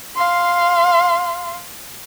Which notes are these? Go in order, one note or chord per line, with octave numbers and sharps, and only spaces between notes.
F5 C6